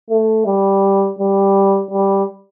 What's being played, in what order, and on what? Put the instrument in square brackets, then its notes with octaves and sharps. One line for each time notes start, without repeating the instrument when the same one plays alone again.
[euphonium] A3
G3
G3
G3